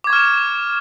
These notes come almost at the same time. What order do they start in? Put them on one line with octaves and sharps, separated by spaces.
D6 G#6 C#6 F6 E7